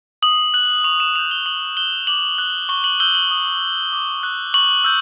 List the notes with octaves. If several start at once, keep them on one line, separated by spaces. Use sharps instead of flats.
D#6 F#7
F#6 F#7
C#6 F7
E7
E6 G6 F7
G7
D#6 F#7
F#6 G7
D6 F#7
F#6
C#6 G7
F#7
E6 G6 G7
F#7
D#6
F#6
D6
F#6
C#6 F#7
E6 G6